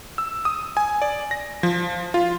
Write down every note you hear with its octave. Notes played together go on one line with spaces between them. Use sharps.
E6
D#6
G#5
D5
A#6
F3
F4